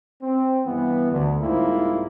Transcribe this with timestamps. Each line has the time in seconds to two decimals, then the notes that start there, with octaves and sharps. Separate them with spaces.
0.22 C4
0.65 G2 E3 B3
1.11 D2
1.40 C2 G#2 A#3 E4 F4